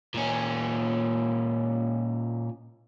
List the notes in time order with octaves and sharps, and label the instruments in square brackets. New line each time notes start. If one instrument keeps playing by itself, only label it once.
[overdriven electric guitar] A#2 C#4